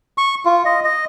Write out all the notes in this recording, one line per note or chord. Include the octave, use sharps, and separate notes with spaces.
C#6
F4
D#5
D#5